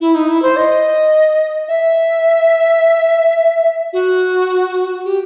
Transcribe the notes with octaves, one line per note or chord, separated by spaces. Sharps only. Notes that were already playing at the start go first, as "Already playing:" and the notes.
E4
D#4
E4
C5
D#5
E5
F#4
G4